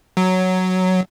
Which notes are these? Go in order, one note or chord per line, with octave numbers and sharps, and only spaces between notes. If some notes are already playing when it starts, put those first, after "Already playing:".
F#3